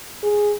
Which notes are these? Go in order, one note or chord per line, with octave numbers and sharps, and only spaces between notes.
G#4